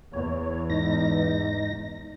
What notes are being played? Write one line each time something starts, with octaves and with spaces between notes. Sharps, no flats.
E2 C#5
G#2 D#4 A#6